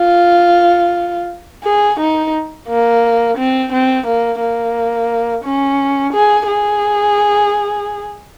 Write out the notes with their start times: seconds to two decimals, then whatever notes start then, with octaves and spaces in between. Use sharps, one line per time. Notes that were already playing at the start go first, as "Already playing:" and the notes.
Already playing: F4
1.64 G#4
2.00 D#4
2.69 A#3
3.37 C4
3.72 C4
4.07 A#3
4.41 A#3
5.44 C#4
6.13 G#4
6.48 G#4